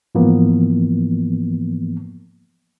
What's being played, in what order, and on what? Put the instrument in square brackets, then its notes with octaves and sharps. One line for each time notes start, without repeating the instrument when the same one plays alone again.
[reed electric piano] G#2 E3 F3 A#3 B3